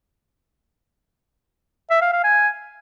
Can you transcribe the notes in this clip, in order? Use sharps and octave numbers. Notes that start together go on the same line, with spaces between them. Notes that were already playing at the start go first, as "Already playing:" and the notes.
E5
F5
F5
G#5